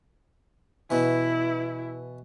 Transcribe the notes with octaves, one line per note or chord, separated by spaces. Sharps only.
B2 E3 E4